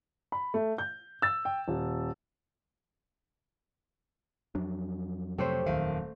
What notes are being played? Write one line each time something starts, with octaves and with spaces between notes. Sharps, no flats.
B5
A3
G6
E6 A6
G5
D#1
F2 F#3 D4
C3 A3 G4 C5 C#5
D#1 D#3 E5 F5